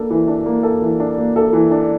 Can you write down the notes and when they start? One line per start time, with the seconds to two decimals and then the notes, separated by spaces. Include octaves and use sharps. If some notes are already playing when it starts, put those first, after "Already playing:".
Already playing: A#3 D4 A4
0.10 E3
0.28 D4
0.46 A#3
0.63 A4
0.81 E3
1.00 D4
1.18 A#3
1.36 A4
1.53 E3
1.71 D4